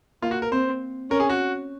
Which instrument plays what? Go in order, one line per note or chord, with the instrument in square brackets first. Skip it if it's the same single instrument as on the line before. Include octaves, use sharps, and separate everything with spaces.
[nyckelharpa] A#3 [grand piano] F4
[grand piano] F#4
A#4
[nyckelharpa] C4 [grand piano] C5
[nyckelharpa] C#4 [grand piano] A#4
[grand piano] G#4
F#4